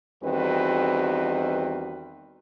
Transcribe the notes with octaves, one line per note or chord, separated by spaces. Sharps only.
E2 D#3 G3 C4 F#4 B4